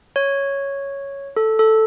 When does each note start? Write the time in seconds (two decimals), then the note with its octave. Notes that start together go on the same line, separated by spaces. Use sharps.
0.16 C#5
1.37 A4
1.59 A4